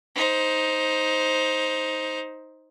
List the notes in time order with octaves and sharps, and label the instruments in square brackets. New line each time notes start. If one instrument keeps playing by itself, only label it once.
[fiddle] D#4 C5